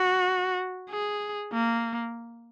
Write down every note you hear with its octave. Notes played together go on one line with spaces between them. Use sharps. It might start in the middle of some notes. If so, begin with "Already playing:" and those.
Already playing: F#4
G#4
A#3